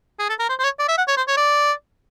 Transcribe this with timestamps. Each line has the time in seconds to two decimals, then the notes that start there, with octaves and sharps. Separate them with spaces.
0.19 G#4
0.29 A4
0.39 A#4
0.49 C5
0.59 C5
0.64 C#5
0.79 D5
0.88 E5
0.98 F#5
1.08 C#5
1.17 C5
1.28 C#5
1.37 D5